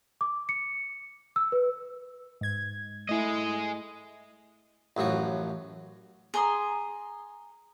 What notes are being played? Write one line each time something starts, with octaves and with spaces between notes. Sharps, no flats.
D6
C#7
E6
B4
G#2 G#6
A3 E4 G#4 D#5
A1 F#2 F3 F#4
G#4 A#5 C6 D#6